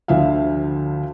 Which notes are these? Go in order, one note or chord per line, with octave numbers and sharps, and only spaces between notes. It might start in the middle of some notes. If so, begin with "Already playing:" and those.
D2 D3 F3 E5 F5